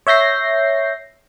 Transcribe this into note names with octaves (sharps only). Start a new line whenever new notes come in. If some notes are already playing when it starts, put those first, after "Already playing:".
C#5 E5 G6 A#6 C7